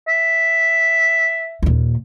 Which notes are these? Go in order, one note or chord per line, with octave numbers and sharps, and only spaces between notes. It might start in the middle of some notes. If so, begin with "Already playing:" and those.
E5
D#2 A#2